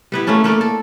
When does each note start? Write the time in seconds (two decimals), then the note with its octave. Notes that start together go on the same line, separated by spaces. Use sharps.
0.12 G3 B3 E4
0.27 A3 A#3 C#4 A4
0.44 A3 A#3 A4 D5
0.61 A4